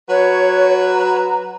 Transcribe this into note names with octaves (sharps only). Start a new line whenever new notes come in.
F#3 B4 C#5
A#5